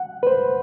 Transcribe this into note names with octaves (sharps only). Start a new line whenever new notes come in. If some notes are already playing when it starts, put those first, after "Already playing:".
Already playing: F#5
B4
C5